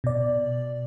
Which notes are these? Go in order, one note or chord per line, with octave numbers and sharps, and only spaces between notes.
B2 D5